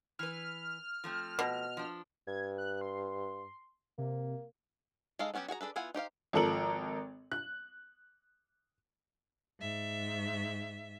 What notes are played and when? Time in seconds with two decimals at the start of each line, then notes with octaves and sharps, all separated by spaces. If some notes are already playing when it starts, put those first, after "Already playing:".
0.19 E3 B4 F6
1.04 F3 A3 C4
1.39 B2
1.77 F3 D4
2.27 G2 G#6
2.58 F#6
2.81 C6
3.98 C3 A#3
5.19 G#3 D#4 A4 D#5 F5
5.34 F#3 B3 C#4 F#4 G4
5.48 F#4 G#4 F#5 A#5
5.61 D4 G#4 A4 B4
5.76 B3 E4 F4 F#5 G#5
5.94 D#4 G4 C5 F5
6.33 G#1 F3 A4 A#4 F#7
7.32 F#6
9.60 G#2 E5